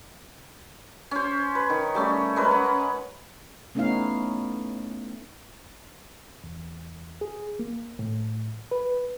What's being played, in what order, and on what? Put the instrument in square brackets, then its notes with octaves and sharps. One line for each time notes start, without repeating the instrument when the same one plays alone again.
[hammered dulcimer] C#4 C5
B4
D#3
G3 A3 C#4
G#3 C#4 A#4 B4
F#5
[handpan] A3 B3 C#4 D#4 E4 F5
[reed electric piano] E2
G#4
A#3
A2
B4